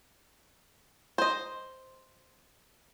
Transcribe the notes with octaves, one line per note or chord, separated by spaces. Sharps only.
C5 D#5